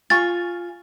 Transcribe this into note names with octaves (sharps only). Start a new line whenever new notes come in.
F4 G#5 C#6 A6